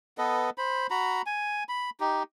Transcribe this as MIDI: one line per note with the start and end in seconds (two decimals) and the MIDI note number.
0.18 0.50 59
0.18 0.50 69
0.18 0.50 71
0.18 0.50 75
0.58 0.87 72
0.58 0.87 83
0.90 1.22 66
0.90 1.22 82
0.90 1.22 83
1.26 1.64 80
1.69 1.90 83
2.00 2.23 63
2.00 2.23 67